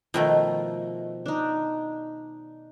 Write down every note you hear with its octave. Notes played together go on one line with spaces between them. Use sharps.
B2 D#3 F3 A3
D4 D#4